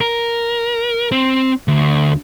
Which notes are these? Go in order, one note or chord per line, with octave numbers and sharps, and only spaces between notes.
A#4
C4
D2